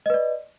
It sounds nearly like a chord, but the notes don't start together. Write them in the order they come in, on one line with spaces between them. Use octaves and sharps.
D#5 B4 D5